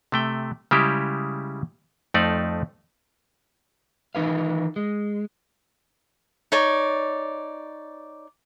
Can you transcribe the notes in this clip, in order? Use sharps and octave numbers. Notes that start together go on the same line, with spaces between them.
C3 A3 G5
C#3 G3 G#3 E4 G4
F2 F3 A3 D#4 D5
D#3 E3 D#4 B4 F5
G#3
D#4 C#5 D5